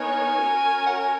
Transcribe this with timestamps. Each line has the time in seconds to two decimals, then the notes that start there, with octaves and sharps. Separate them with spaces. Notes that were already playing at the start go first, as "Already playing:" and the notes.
Already playing: B3 D#4 A#4 C#5 G#5
0.39 C#4 F#4 A#4 C#5
0.87 F#5
1.00 G#5